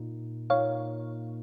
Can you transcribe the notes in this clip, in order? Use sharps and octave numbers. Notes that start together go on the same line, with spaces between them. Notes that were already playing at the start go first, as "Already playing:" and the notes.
Already playing: A#2 A#3 D#4
A#2 A#3 D#4 C#5 F5